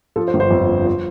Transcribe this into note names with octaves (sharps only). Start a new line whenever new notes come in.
F3 A4
C5
G1
C5
F2
F3
C5